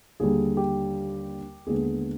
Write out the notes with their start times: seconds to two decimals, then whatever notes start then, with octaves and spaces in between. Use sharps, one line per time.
0.20 D#2 D3 G3 G#4
0.57 G4
1.66 D#2 D3 G#3 B3 G#4